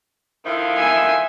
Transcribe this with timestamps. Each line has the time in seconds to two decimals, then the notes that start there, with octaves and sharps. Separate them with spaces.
0.45 D3 D#3 F3 E4 F5
0.78 E5 G#5